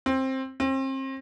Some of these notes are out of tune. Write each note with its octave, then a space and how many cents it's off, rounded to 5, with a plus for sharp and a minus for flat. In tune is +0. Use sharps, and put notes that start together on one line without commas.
C4 +15
C4 +35